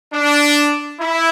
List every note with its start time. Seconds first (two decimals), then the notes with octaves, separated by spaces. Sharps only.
0.14 D4
1.01 E4